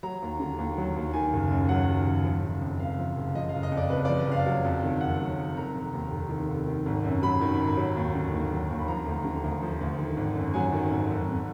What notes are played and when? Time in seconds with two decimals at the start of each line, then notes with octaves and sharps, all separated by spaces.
0.03 F#3 A#5
0.22 D#2
0.40 D3
0.58 D#2
0.78 F#3
0.96 D#2
1.13 D#3 G#5
1.33 F#1
1.51 F#2
1.69 F#3 F#5
1.88 D#3
2.06 F#1
2.25 F3
2.43 F#1
2.62 F2
2.79 F#1 F5
2.99 F3
3.17 F#1
3.35 F3 D#5
3.49 F5
3.54 F#1
3.63 D#5
3.72 F2
3.77 D5
3.90 F#1 B4
4.05 D5
4.09 F3
4.27 F#1 F5
4.46 F#3
4.64 F2
4.83 D#3
5.01 F2 F#5
5.20 F#3
5.39 F2
5.56 D#3 A#5
5.75 F1
5.93 D#2
6.11 F1
6.30 D#3
6.48 F1
6.67 D#3
6.86 G#1
7.05 F#2
7.22 F#3 B5
7.41 D#3
7.60 G#1
7.77 F#3
7.96 D#2
8.15 D3
8.32 D#2
8.51 F#3
8.70 D#2
8.79 B5
8.88 F3 A#5
9.06 D2
9.25 D3
9.44 D2
9.62 F3
9.81 D2
9.99 D#3
10.17 G#1
10.35 F#2
10.54 F#3 G#5
10.73 D#3
10.91 G#1
11.09 F2
11.28 F2